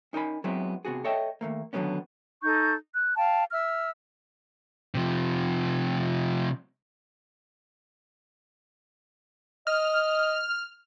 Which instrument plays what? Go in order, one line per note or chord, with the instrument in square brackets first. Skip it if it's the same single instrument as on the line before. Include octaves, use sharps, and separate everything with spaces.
[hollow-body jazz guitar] C#4 D#4 A#4 G#5 B5
F#3 G#3 B3 C4 E4 C5
C3 B3 F#4 G#4
A4 C#5 D#5 E5 G5
D#2 B2 A3 A#3
D3 D#3 F#3 A#3 B3 C#4
[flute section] D#4 A4 C#6 G6
F#6
F5 G5 A5
E5 E6 F6
[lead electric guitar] C3 F3
[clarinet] D#5 [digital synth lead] F6